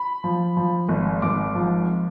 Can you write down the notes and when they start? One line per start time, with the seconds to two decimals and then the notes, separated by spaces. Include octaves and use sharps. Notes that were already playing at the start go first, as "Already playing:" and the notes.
Already playing: B5
0.24 F3
0.57 F3
0.89 G#1
1.22 G#1 D6
1.55 F3